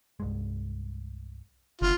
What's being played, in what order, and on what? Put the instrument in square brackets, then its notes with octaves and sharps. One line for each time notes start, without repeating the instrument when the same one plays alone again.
[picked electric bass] C2 G2 G#3
[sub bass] F#1 [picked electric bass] D3 [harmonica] F4